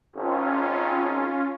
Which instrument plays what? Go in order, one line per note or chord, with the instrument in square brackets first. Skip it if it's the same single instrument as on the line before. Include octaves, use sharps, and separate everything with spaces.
[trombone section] G#1 [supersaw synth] C#4 F4